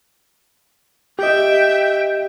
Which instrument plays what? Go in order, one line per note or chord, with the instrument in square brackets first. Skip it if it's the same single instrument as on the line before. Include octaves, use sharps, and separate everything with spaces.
[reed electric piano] G4 D#5 [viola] E5 G5